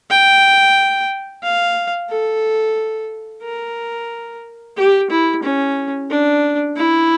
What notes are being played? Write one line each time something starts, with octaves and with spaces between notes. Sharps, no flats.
G5
F5
A4
A#4
G4
E4
C#4
D4
E4